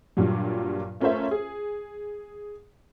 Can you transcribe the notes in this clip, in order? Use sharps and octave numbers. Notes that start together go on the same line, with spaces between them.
G2 A#2 F#3 G3
A3 C#4 F4 A#4 C5 E5
G#4